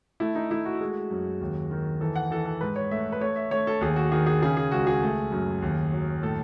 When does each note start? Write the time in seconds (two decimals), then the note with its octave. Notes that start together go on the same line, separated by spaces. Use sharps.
0.20 A3 E4
0.35 D#4
0.51 A3 E4
0.65 F#4
0.80 G#3
1.11 F#2
1.41 D#2
1.71 D#3
2.01 E3 A4
2.16 F#5
2.31 E3 A4
2.46 A4
2.61 G#2 B4
2.76 C#5
2.91 A3 E5
3.12 B4
3.21 A3 C#5
3.36 E5
3.51 A3 C#5
3.67 A4
3.81 D#2 G#4
3.96 F#4
4.12 D#3 G#4
4.26 G#4
4.42 C#3 G#4
4.57 G#4
4.71 C#2 F#4
4.87 G#4
5.02 A3
5.32 F#2
5.62 D#2
5.92 F#3
6.23 A2 A4